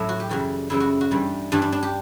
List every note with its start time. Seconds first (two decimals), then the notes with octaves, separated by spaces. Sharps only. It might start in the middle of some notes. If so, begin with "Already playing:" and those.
Already playing: A2 F#3 A3 E4
0.09 F#4
0.20 G4
0.29 F#2 C#3 E3 G3 F#4
0.70 F#2 C#3 E3 G3 E4
0.80 F#4
1.01 F#4
1.11 G2 E3 G3
1.52 G2 E3 G3 D4
1.62 D4
1.72 D4
1.83 G4